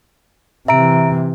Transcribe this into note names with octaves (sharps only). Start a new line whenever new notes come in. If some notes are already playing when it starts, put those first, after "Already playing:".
C3 E3 E5 A#5 D7